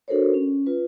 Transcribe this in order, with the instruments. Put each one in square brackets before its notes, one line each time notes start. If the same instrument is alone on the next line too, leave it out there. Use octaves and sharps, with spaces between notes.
[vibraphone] D4 F#4 A4 A#4 C5 C#5
C#4
F4 B4